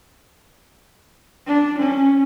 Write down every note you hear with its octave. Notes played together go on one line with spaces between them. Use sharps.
D4
C#4